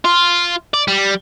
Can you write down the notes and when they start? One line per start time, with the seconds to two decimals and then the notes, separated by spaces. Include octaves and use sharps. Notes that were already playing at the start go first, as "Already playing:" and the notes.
0.05 F4
0.74 D5
0.88 G3